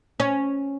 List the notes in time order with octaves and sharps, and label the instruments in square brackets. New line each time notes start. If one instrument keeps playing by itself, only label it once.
[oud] C#4